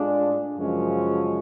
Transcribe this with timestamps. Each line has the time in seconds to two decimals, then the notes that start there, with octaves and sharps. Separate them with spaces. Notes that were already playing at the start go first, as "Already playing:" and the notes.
Already playing: A2 G#3 D4 F4 G#4
0.57 F#2 C#3 F3 G#3 C#4